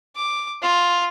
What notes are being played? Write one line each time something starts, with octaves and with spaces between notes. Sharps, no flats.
D6
F4